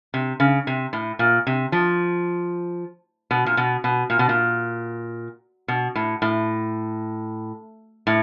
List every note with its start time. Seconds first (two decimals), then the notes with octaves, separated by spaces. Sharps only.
0.14 C3
0.40 C#3
0.67 C3
0.93 A2
1.19 A#2
1.47 C3
1.72 F3
3.31 B2
3.46 A#2
3.57 B2
3.84 B2
4.10 A#2
4.19 B2
4.29 A#2
5.68 B2
5.95 A2
6.22 A2
8.07 A2